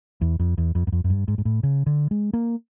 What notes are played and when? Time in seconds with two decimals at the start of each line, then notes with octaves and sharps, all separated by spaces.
0.21 E2
0.39 F2
0.58 E2
0.75 F2
0.87 F#2
0.92 F2
1.04 F#2
1.10 G2
1.28 G#2
1.38 G#2
1.45 A2
1.63 C#3
1.86 D3
2.11 G#3
2.33 A#3